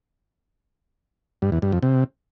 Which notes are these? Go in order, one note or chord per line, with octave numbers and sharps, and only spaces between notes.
G2
E2
G2
F2
C3